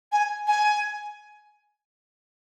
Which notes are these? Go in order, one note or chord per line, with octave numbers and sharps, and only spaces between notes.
G#5
G#5